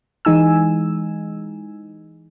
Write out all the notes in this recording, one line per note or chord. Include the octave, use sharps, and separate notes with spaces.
E3 G#3 D#4 G#5 E6